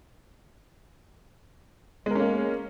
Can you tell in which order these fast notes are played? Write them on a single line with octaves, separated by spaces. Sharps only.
G#3 A#4 C#4 A#3